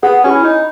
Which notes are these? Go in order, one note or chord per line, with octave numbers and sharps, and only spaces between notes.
B3 G#4
C#4 F#4
E4
D#4